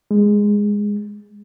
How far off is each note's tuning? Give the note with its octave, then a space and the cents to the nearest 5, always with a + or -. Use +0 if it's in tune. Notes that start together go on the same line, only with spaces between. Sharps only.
G#3 -10